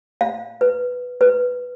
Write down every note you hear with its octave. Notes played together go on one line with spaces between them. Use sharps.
F5
B4
B4